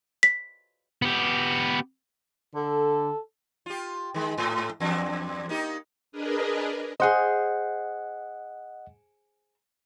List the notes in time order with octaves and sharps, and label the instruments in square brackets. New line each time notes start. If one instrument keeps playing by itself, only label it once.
[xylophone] B6
[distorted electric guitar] B3 G4
[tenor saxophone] D3 [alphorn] A4
[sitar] F4 G4
D#3 G#3
G#2 A3
E2 G2 D4
A#3 D#4 G4
[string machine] D4 G#4 A#4 B4 D#5
[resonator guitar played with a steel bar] G#4 C5 [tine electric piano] D#5 F#5